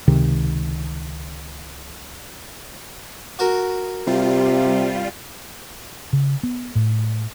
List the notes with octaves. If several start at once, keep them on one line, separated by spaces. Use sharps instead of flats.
C#2 C3 D#3
F#4 A#4
C3 G3 F4
C#3
B3
A2